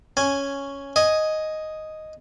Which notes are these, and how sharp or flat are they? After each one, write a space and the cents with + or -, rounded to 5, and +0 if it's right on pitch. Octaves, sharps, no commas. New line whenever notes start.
C#4 +0 G#5 +0
D#5 +0 G#5 +5